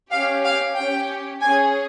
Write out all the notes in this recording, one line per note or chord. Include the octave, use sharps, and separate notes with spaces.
C#4 G4 F5
F5
C#4 G4 G5
C#4 G#4 G#5